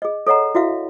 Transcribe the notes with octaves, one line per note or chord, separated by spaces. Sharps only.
G#4 D#5
A4 C#5 D#5 F#5 A#5
E4 F#4 E5 F5